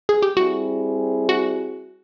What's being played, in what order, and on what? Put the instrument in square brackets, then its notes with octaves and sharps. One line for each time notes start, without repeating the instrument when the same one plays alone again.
[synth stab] G#4
G4
[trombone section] G3 C4 E4 G#4 [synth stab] F#4
[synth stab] F#4